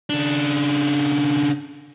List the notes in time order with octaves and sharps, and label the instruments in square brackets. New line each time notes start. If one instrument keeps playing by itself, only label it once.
[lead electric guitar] C#3 D4